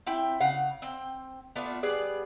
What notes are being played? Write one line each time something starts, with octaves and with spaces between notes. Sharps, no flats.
C4 E4 G5
C#3 F5 F#5
C4 G5
A3 B3 D4 F4
G3 B3 G#4 D5